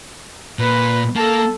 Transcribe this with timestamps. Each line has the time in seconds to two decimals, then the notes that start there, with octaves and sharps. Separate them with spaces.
0.59 A#2 B4
1.16 A#3 A4 A5